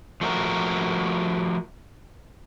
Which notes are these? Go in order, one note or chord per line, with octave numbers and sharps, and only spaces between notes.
F3 A3 F#4 A#4